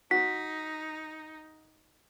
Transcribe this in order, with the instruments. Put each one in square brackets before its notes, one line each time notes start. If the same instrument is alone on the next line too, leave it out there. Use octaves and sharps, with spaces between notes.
[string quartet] D#4 [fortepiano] F#4 [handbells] B6